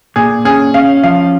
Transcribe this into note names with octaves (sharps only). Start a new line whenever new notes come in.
A#2 G#4
C#4 G#4
C#4 F5
F3 F5